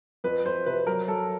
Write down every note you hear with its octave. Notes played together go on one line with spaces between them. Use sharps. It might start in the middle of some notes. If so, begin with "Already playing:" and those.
F2 B4
F2 C5
C3 B4
F#3 A#4
F#3 A4